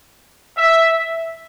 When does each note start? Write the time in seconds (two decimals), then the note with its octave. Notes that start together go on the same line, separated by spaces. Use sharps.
0.57 E5